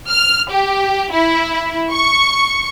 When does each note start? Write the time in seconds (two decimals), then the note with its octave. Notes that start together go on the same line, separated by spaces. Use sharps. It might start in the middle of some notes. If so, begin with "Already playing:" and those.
0.10 F6
0.51 G4
1.12 E4
1.92 C#6